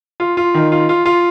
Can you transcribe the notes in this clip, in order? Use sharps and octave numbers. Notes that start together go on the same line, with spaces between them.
F4
F4
D#3
F4
F4
F4